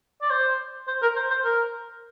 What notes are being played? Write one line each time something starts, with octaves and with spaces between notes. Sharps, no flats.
D5
C5
C5
A#4
C5
C5
A#4